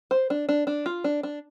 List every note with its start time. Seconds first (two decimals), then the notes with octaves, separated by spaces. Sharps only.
0.11 C5
0.30 D4
0.49 D4
0.67 D4
0.86 F4
1.04 D4
1.23 D4